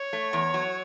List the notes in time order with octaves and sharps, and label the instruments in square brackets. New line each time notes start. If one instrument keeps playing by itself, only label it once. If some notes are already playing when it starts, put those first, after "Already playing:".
Already playing: [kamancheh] C#5
[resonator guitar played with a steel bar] A3
E2
F#3